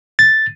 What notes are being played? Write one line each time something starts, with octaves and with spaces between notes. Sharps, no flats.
A6